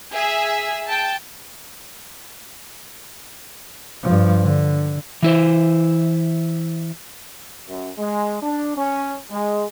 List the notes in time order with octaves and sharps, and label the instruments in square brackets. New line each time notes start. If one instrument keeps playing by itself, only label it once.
[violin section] G#4 E5
G5 A5
[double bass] G2 F3
D3
[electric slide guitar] E3 E4 C5
[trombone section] F#2
G#3
D4
C#4
G#3